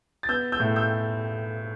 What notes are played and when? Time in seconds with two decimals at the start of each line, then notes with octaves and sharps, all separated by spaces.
0.23 A6
0.29 B3 E6 G6
0.52 E6 G6
0.60 A2
0.76 E6 G6